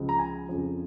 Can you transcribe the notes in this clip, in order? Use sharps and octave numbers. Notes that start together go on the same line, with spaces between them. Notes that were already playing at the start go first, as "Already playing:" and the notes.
Already playing: C#2 C#3 F3
A#5
G#5
F2 C#3 F3